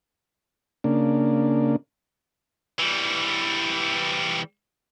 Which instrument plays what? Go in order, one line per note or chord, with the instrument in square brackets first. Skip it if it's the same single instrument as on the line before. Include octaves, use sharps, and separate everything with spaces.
[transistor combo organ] C#3 A#3 D4
[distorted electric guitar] E3 G3